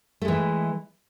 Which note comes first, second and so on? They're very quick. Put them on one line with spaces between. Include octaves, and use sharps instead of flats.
A3 G#3 E3